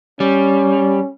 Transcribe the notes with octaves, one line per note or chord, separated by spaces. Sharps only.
G3 C#4